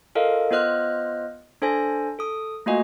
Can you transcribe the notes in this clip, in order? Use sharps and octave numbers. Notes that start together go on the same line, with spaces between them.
F4 A4 A#4 D#5 F5
B3 F4 C5 D#5 F6 F#6
D4 A4 C5 G#5 A#6
A4 D#6
A3 A#3 F4 F#4 D#5 G#5